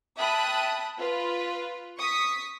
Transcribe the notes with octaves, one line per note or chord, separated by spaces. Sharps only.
E5 G5 A5 B5 D#6 F#6
F4 B4
C#6 D#6 B6